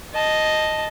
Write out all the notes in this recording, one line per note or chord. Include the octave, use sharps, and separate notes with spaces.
D#5 A5